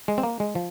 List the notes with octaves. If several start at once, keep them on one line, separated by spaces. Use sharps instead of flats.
G#3
C4
A#3
G#3
F3